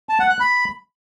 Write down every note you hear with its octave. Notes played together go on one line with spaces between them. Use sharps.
A5
F#5
F#6
B5